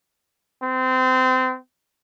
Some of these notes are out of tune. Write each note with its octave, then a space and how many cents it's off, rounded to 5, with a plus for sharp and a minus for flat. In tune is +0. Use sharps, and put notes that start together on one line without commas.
C4 -25